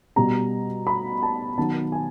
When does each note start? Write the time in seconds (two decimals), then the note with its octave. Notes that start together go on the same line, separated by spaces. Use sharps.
0.16 B2 G3 B3 A#5
0.87 B5
1.23 A5
1.58 D#3 F#3 B3 A5
1.92 G#5